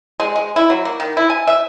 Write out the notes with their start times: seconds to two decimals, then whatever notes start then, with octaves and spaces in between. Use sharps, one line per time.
0.20 G#3
0.36 G#3
0.56 E4
0.70 F#3
0.85 A#3
1.00 D#3
1.17 E4
1.30 G#5
1.47 E5